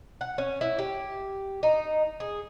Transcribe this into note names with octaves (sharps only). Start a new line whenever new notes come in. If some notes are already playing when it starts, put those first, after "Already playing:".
F#5
C#4
E4
G4
D#4
G#4